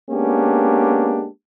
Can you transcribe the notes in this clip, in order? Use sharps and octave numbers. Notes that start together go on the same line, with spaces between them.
G#3 A#3 B3 C#4 D4 G4